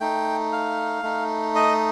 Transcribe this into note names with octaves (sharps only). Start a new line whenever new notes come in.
A3 D#4 G5
F5
A3 D#4
D#5